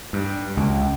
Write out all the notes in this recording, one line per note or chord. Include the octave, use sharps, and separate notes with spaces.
G2
C#2